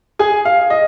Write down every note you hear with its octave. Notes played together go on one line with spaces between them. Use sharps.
G#4 G#5
F5
D#5